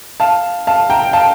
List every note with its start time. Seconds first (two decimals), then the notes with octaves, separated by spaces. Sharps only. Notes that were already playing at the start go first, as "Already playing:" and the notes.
0.20 F5 A5
0.67 F5 A5
0.90 G5 A#5
1.13 F5 A5